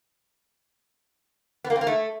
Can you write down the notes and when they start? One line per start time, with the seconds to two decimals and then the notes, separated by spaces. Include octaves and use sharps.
1.64 B3
1.70 A#3
1.76 C4
1.81 A#3
1.87 A3